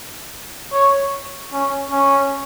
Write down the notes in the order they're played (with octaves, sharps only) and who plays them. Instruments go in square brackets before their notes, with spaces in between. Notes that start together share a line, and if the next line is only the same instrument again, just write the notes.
[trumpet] C#5
C#4
C#4